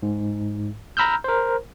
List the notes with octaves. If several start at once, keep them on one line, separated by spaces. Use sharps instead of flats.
G#2
A#5 B5 E6 F6 G6
A#4 C5